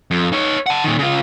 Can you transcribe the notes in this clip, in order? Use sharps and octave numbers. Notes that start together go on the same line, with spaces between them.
F2
D#4 C#5
F#5 A5
A#2 D#3
C#3 F4